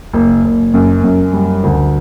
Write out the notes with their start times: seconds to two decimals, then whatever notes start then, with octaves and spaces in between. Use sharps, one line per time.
0.13 F#1
0.44 F#1
0.74 F#2
1.04 F#2
1.33 G3
1.63 D2